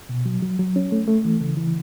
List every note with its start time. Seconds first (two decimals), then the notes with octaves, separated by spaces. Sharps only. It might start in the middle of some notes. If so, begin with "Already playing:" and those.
0.09 B2
0.26 F#3
0.43 F#3
0.59 F#3
0.76 C#4
0.92 A3
1.08 A3
1.25 E3
1.40 C#3
1.57 E3